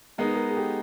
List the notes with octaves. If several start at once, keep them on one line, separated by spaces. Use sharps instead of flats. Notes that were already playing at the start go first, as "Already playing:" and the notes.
G#3 B3 D#4 A#4
B4
G#4 A#4
G#4
G4 A4